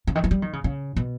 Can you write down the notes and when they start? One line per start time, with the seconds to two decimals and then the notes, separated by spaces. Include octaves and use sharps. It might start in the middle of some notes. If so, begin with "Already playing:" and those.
0.07 C#3
0.15 D#3
0.24 E3
0.31 G3
0.42 D#3
0.53 C#3
0.64 C#3
0.96 B2